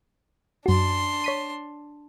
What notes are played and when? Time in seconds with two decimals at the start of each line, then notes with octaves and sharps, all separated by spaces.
0.66 F#2 D4 F#4 C6
1.24 C#5 B6 D#7